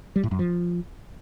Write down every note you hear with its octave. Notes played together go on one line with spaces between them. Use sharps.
G3
A2
F#2
F3